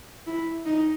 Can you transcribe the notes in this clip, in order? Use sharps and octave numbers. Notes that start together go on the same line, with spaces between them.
E4
D#4